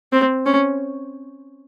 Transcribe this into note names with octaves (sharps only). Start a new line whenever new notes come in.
C4
C#4